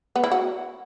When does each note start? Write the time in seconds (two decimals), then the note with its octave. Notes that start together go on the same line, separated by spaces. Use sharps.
0.16 B3
0.24 E4
0.32 F#4